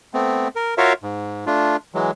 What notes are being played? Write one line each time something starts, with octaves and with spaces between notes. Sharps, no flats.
A3 B3 C4
A#4
F4 F#4 A#4 C#5 E5 F5
G#2
A3 D4 F4
E3 F#3 G#3